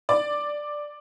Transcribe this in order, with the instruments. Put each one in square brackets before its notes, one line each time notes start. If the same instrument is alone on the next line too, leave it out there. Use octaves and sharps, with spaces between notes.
[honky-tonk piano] D5